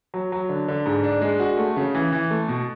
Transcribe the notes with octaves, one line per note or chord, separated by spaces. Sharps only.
F#3
F#3
D3
D3
G#2
D4
G#3
F#4
A3
C#3
E3
E3
A3
B2